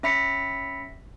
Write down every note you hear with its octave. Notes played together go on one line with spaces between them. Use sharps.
C#4 E5 B5 B6 C#7